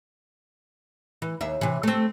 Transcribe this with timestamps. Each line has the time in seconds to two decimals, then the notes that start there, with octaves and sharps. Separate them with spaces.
1.22 E3
1.41 D#2 E5
1.61 C3 E3
1.83 A3 C4